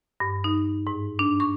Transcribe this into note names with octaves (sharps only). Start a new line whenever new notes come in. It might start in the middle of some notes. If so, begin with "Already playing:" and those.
G2
D#4
G#2
D4
C#6